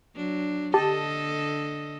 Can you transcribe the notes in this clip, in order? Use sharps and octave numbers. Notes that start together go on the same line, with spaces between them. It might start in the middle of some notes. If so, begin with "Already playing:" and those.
F#3 D4
D3 G4 A4 D#5 A5